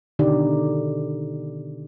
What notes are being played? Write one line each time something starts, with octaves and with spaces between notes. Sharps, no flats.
B2 D3 D#3 D#4 G4 D5